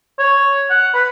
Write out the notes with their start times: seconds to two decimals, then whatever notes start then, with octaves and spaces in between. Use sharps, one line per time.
0.19 C#5
0.70 F#5
0.94 B4